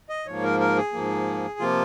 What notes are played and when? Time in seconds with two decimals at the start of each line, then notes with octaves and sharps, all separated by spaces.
0.09 D#5
0.27 G#2 F3 A#3 C#5
0.43 A#4
0.60 A#4
0.76 G#4
0.93 G#2 F3 A#3
1.60 C3 F3 A#3 F4